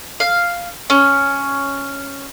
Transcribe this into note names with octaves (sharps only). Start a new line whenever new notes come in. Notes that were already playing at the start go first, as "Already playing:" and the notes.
F5
C#4